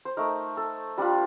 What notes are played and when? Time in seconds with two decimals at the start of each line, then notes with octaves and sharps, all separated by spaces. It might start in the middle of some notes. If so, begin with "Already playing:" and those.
0.05 C5
0.17 A3 D#4 A#4
0.57 A4
0.97 G3 D4 F4 G4